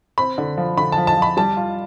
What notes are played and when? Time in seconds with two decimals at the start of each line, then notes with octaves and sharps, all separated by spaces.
0.18 C4 B5
0.38 D3
0.57 F3
0.77 D3 B5
0.92 A5
0.98 F3
1.07 A5
1.17 F3
1.22 B5
1.37 G3 A5
1.57 F4